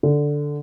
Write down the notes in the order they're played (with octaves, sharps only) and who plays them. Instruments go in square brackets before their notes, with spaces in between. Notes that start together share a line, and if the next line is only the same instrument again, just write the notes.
[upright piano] D3